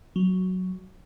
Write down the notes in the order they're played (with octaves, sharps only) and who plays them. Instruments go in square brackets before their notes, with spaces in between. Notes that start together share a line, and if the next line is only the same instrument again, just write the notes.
[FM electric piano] F#3